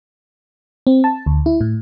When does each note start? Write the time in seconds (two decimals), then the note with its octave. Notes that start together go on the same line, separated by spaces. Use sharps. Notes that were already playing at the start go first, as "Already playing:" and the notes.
0.87 C4
1.04 A5
1.26 D2
1.46 E4
1.61 A2